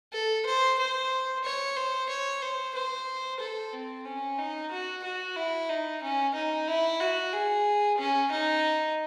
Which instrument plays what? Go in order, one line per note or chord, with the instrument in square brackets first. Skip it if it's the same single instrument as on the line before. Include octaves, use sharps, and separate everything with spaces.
[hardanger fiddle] A4
C5
C5
C#5
C5
C#5
C5
C5
A4
C4
C#4
D#4
F#4
F#4
E4
D#4
C#4
D#4
E4
F#4
G#4
C#4
D#4